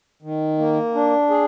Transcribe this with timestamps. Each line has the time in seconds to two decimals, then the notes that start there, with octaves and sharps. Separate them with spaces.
0.22 D#3
0.58 A#3
0.95 D4
1.30 G#4